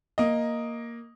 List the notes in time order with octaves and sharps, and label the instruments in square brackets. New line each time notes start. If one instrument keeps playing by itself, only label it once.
[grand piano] A#3 D#5